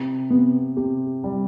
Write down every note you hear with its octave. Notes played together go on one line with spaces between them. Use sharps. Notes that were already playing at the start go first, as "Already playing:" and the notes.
Already playing: C3
C3 B3
C3 G4
G3